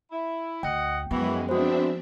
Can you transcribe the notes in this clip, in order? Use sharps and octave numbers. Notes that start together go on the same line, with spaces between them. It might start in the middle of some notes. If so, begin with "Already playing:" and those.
E4
D2 D#5 F#5 G5
F#2 E3 F3 G#3 B3 F#4
D#3 E3 G#3 C4 D4 F#4 C5 E5